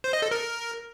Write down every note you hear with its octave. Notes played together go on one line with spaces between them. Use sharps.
C5
D#5
A4
A#4